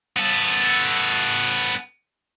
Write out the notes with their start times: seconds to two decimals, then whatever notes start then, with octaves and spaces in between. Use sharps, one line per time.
0.16 B3 A4